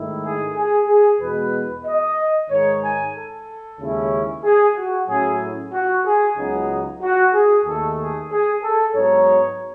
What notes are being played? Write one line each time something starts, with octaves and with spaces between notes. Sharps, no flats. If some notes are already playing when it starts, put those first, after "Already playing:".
Already playing: G#2 D#3 A3 E4
G#4
G#4
G#4
E2 B2 G#3 B3 B4
D#5
G#2 D#3 G#3 D#4 C#5
G#5
A4
D#2 C#3 G#3 C#4 E4
G#4
F#4
A2 F#3 C#4 E4 G#4
F#4
G#4
C#2 C#3 F#3 B3 D#4 G#4
F#4
G#4
D#2 D#3 A3 A4
G#4
G#4
A4
G#2 F#3 B3 D#4 C#5